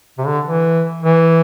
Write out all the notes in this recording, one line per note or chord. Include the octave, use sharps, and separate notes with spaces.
C3
D3
E3
E3